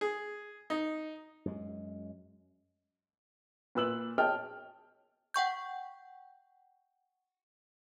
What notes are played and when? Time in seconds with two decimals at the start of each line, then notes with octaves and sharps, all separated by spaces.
0.01 G#4
0.70 D#4
1.45 F#2 G#3
3.75 A#2 B4 E6 F#7
4.18 G#4 C#5 D#5 G5 A5 F6
5.34 F#5 G5 C#6 G6